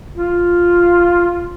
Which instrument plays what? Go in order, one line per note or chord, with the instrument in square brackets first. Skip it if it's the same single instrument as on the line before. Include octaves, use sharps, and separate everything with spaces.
[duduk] F4